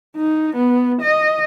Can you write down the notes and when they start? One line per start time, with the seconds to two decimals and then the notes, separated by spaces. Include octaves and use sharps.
0.17 D#4
0.56 B3
1.01 D#5